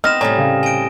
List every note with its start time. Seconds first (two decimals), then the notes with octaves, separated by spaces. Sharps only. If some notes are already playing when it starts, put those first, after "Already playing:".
0.04 B3 C4 D#4 D#5 D#6 F6 A#6 E7
0.21 A2 C3 G3 C#5 D5 G#5 A#5
0.38 C#3
0.63 D#5 G5 G#5 D7